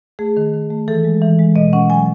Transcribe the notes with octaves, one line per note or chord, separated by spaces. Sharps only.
A3 G#4
D#3
D#3
A3
E3 A4
G#3
E3
G#3
B2 D#5
C#4 F#5
F#3 G#5